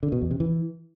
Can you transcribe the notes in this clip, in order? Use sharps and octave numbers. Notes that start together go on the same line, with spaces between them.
D3
B2
E2
C3
E3